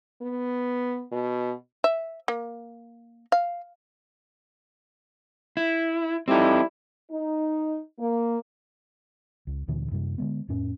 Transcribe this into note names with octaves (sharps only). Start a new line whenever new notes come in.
B3
B2
E5
A#3
F5
E4
G3 C4 D#4 E4 A4
D#4
A#3
C#2
D2 A#2 D3 E3
F#2 C3 G3
D3 G#3 B3
F2 A2 C#4